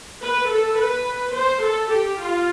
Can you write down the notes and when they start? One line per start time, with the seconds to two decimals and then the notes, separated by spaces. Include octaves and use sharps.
0.22 B4
0.51 A4
0.79 B4
1.36 C5
1.63 A4
1.92 G4
2.21 F4